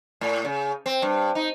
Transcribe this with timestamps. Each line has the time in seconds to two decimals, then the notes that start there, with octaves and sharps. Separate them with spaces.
0.21 A2
0.45 C#3
0.86 C4
1.02 G2
1.35 D#4